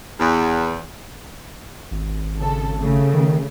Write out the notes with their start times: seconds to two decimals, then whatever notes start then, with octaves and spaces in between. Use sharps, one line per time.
0.20 E2
1.91 G#1
2.40 C#3 A4
2.81 C#3 A3
3.14 D#3